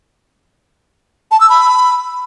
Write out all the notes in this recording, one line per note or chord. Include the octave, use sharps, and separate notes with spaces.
A5
E6
B5